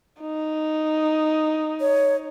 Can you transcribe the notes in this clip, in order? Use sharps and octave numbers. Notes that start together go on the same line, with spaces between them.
D#4
C#5